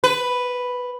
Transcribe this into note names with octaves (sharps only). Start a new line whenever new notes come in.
B4